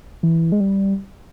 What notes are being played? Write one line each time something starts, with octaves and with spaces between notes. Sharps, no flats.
E3
G#3
G3